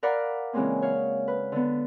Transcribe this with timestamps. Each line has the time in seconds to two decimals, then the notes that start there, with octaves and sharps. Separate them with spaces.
0.03 A#4 D5 F5 F#5 A#5 B5
0.53 C#3 E3 G#3 A#3 C4 C#4
0.82 C#5 F5
1.28 B4
1.52 D3 B3